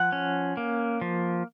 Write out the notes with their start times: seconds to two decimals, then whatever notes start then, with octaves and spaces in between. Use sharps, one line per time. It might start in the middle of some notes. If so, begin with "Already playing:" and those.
Already playing: F3 F#5
0.12 C#4
0.57 A#3
1.02 F3